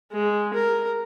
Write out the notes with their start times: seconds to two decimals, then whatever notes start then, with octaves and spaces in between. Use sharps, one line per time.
0.11 G#3
0.54 A#4